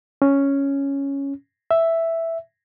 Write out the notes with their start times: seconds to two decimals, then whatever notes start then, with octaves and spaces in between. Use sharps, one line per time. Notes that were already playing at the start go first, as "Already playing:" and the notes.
0.22 C#4
1.71 E5